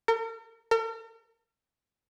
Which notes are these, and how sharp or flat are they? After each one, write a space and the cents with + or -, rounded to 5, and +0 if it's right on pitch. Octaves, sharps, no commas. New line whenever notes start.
A#4 -40
A#4 -45